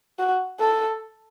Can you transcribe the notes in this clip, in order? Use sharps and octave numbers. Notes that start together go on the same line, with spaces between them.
F#4
A4